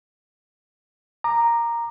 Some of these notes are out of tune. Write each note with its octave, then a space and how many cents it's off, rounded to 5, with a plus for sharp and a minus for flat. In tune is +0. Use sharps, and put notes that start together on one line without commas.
A#5 +0 D6 +35